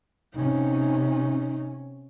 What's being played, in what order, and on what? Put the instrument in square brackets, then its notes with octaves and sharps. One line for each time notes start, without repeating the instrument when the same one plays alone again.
[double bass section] C3 C#4 [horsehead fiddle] D#4